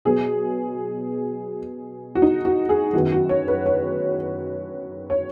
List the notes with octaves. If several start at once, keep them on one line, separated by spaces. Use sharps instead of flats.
B2 F#3 B3 G#4
F#4
D#4
F#4
G#4
F#2 D#3 B3 F#4
F#4
C#5
B4
C#5
C#5